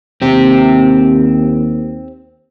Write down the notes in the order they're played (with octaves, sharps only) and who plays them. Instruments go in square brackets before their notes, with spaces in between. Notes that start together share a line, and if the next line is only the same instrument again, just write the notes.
[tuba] D#2 [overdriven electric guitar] C4 G4